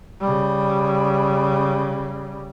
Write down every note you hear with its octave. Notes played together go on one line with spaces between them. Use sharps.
C#3 G3